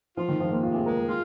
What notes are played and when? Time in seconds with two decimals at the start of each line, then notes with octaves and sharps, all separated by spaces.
0.17 F3 F4
0.29 D#3
0.40 F3 G#3
0.52 A#3
0.63 C3 F4
0.74 G#4
0.86 G#3 A#4
0.97 A#4
1.09 F4 G#4